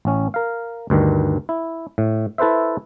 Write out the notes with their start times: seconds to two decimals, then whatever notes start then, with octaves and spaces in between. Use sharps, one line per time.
0.05 A1 C#4
0.34 A#4 F5
0.90 D2 G2 D#3
1.49 E4
1.98 A2
2.38 E4 A4 B4 C5 E5